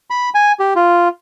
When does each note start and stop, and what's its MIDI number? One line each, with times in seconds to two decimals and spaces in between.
0.10 0.29 83
0.34 0.52 80
0.59 0.74 67
0.76 1.08 65